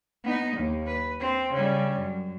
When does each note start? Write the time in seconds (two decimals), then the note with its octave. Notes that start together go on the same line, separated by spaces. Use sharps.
0.24 B3 D#4
0.57 D#2
0.87 B4
1.20 C4
1.53 C#3 G3
1.99 F#2